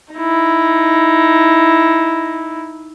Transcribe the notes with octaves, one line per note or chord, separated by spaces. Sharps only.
D#4 E4